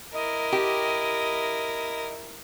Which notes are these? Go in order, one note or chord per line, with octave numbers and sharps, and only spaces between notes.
E4 A#4 D#5
G4